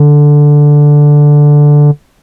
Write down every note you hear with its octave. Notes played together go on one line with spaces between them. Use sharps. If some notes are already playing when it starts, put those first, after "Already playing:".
Already playing: D3